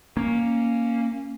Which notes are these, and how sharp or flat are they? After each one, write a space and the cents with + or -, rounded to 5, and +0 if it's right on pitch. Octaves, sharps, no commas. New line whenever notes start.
A#3 +0 C#4 +0